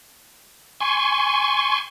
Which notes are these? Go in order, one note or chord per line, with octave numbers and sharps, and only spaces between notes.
G#5 C6 C#6